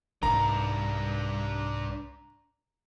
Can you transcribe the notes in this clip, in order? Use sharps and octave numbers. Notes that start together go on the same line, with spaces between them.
C2 G#2 D4 B4 A#5